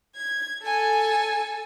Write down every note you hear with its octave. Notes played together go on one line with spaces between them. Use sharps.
G#6
A4 G#5